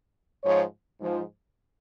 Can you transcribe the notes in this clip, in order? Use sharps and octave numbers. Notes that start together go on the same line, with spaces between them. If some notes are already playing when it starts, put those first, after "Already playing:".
G#2 F3 C#5
G#2 F3